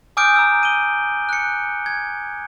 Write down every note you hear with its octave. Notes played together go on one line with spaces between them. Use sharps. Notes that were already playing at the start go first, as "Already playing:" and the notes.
G#5 D6 D#6 F6 G6 D7
A#5 E6
D#7 G7
F#6 C#7
G#6